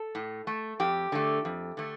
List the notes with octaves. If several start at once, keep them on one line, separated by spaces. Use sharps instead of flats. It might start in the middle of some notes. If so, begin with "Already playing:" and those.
Already playing: A4
A2
A3
F2 G4
D3 A3
F2
D3 A3